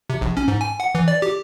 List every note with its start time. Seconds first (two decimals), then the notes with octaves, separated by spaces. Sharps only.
0.10 C3
0.21 A#1
0.37 C#4
0.48 G#2
0.61 G#5
0.80 F#5
0.95 E3
1.08 D5
1.22 G4